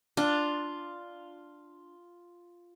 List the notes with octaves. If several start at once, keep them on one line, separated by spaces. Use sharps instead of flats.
D4 F4